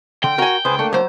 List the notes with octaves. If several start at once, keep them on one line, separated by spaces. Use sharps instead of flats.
D3 G5
F#4 A#4 G#5
C#2 G#4 B4 C5
A3 A#3 D4
F#3 C5